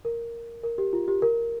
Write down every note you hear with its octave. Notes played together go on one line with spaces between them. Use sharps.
A#4
A#4
G4
F4
G4
A#4